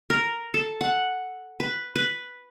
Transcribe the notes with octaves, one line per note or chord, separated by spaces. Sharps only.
A#4
A4
F#5
B4
B4